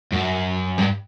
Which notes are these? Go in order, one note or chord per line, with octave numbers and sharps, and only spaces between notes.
F#2
G2